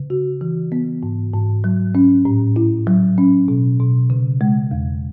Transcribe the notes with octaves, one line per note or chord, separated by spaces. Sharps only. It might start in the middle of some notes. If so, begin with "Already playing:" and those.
Already playing: C#3
F#4
E3
B3
G#2
G#2
F#3
C#4
A2
E4
F#3
C#4
B2
B2
C#3
G#3
E2